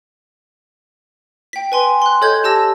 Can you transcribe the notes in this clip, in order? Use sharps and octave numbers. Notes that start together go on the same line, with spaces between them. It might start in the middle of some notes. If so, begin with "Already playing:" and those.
G5 B6
B4 G#5 C6
C6 F#6
A4 C#5 D#5 G6 G#6
G4 A5 E6 A#6